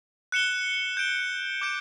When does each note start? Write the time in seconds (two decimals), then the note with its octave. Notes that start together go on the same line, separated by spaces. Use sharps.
0.32 F#6 C#7 E7 G7
0.97 G6 D7 G7
1.61 D6 G6 D7